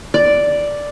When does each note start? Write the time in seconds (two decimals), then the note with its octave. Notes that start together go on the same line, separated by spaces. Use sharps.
0.14 D5